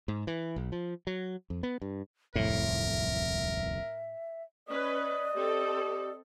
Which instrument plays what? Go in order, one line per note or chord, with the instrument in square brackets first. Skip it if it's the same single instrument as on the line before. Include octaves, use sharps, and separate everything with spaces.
[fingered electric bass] G#2
E3
B1
F3
F#3
F2
B3
G2
[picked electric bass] D1 C2 F2 [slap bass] A2 [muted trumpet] A#4 [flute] E5
[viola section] C#4 B4 [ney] D5 [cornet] D#5
[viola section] C4 A4 [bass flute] G4